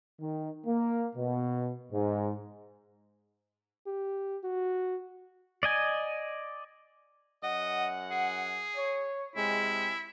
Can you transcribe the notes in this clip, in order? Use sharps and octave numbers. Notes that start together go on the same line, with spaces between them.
D#3
A#3
B2
G#2
G4
F#4
D5 D#5 G#5
F#2 D#5 F#5
G#4
C#5
C3 G#3 E4